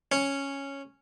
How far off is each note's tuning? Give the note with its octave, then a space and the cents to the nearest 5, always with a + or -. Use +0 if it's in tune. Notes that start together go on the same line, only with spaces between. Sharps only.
C#4 -5